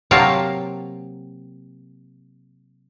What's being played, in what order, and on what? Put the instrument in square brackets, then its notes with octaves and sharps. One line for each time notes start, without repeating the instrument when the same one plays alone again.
[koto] C3 F#3 A#3 F5 G5 A5